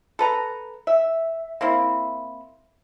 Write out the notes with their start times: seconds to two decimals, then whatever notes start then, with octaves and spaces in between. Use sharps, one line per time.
0.19 A4 B4 A#5
0.87 E5
1.61 A#3 C4 E4